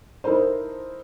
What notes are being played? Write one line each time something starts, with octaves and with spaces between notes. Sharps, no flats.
D#4 E4 A4 A#4 C5